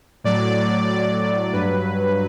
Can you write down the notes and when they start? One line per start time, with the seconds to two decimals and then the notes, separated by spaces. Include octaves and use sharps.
0.24 A2 F#3 D5
0.88 D5
1.53 G2 F#3 B4